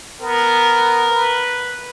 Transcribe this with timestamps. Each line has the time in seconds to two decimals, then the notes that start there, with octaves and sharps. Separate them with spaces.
0.21 B3 A#4
1.11 B4